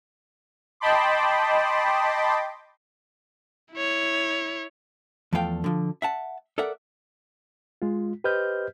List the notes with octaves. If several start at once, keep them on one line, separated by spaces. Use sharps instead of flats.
D#5 G5 A5 B5 C6 D6
E4 C#5
E2 F3 A3 A4 F5 G5
D3 F3
E5 F#5 A5
A4 A#4 D5 E5 F#5
G#3 F4
G4 B4 C5 D#5 F6 G6